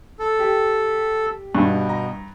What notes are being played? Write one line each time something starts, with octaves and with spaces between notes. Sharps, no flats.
A4
G4
G2 B2
A#5